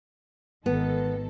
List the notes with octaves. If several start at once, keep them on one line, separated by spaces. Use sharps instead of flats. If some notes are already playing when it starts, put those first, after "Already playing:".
G#1 D#3 B3 A4